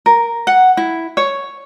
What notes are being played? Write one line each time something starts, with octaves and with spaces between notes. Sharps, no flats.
A#4
F#5
E4
C#5